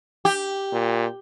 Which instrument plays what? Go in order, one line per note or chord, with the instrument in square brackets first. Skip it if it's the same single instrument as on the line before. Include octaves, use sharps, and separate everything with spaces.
[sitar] G4
[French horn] A#2